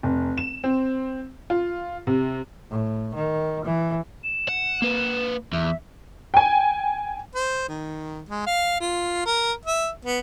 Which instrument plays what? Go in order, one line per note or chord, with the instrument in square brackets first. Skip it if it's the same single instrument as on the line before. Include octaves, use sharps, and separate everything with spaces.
[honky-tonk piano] F1
E7
C4
F4
C3
[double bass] A2
D#3
E3
[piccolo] E7
[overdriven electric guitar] F#5
A#3 B4
[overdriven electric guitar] E2 [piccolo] E5
[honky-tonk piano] G5 G#5
[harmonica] C5
D#3
G#3
F5
F4
A#4
E5
B3